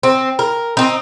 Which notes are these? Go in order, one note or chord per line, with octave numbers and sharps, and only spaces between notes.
C4
A#4
C4 D#4